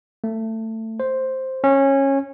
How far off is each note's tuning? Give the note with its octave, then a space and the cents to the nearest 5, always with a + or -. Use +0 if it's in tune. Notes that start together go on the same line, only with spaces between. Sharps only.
A3 +20
C5 +5
C#4 -20